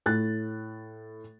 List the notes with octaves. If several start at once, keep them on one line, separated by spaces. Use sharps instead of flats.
A2 F#6 A6